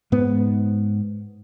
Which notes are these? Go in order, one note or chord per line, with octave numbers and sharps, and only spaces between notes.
G#2 B3